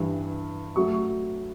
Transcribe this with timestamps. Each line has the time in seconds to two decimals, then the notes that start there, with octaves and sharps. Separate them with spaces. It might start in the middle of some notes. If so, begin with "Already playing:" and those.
Already playing: G2 E3 G3
0.76 F#3 A3 C#6